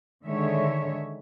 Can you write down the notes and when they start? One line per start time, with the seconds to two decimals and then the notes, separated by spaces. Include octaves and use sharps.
0.25 D3 D#3 G#3 C#5 E5